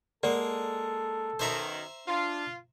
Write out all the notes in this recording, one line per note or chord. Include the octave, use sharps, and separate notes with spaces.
G#3 A#3 A4 A#4 D5 F#5
F#2 B2 D#3 C5 E5 A#5
D4 F4